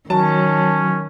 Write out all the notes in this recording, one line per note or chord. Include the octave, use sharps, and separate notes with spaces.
D#3 F#3 C#4 A5